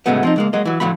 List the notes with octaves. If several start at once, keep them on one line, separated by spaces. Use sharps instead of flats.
A2 C#3 F#3 G#3 A3 B3
F3 C4 D#4
C#2 G#3 A#3
F#3 G#3 A#3 D#5
E3 F#3
A2 D3 F3 F#3 A3 B5